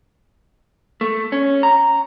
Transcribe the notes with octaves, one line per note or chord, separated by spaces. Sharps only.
A3
C#4
A#5